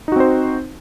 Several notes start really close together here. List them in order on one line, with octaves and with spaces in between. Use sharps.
D#4 F#4 C4 C5